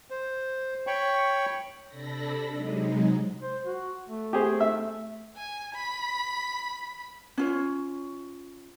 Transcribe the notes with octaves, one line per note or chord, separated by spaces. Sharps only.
C5
C#5 G5 B5 C#6
C3 D4 A4 B5 A#6
C3 F#3 G#3 D#4
C5
F#4
A3
G4 G#4 C5
E5
G#5
B5
C#4 F4 C#5